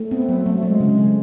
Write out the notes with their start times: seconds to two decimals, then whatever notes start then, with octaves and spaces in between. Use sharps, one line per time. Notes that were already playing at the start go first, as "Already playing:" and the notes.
Already playing: A3
0.11 B3 C4
0.28 F#3 B3
0.41 A3
0.46 F#3
0.55 A3
0.62 F#3
0.68 G#3
0.80 C#3
0.98 C#3